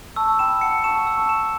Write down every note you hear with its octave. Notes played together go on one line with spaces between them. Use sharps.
A5 C#6 E6
G5 B5 E7
F#5 A5 C#7
A5 C#6 E7
E6
A5 C#6
E7